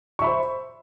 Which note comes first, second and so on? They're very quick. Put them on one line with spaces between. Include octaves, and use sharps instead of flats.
C#6 E5 B5 C5